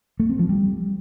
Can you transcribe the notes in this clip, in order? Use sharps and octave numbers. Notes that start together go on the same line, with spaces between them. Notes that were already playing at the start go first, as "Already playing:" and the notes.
A3
C4
F3
G3